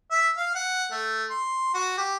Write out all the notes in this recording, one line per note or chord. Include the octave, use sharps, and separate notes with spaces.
E5
F5
F#5
A3
C6
F#4
G4